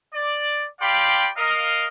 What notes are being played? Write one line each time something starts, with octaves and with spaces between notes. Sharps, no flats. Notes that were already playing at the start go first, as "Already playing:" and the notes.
D5
G4 D5 F5 G5 B5 C6
A#4 D#5 F5